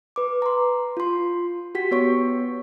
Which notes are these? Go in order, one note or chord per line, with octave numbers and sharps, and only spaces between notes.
B4 D6
A#5 C6
F4 C6
F#4 G4 B6
B3 C#5 C#6